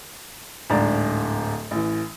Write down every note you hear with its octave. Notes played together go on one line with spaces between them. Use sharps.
D1 G#2 D4 D5 A#5
A1 E3